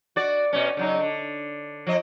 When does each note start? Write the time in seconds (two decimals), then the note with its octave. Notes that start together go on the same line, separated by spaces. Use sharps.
0.16 F#4 D5
0.53 B2 C#4
0.77 C#3 F#3 D#4
1.00 D3
1.87 F3 D#5